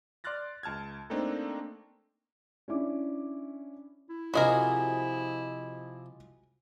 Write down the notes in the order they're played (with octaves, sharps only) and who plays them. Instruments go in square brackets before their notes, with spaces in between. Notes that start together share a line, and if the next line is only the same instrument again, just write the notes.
[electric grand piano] D5 C6 F6 F#6 A6 A#6
C#2 A5 F6 G#6
A3 A#3 C4 D4 D#4 A4
[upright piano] C#4 D4 E4 D5 D6
[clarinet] E4
[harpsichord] C3 F3 [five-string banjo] F#4 G#4 A#4 [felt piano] D#5 B5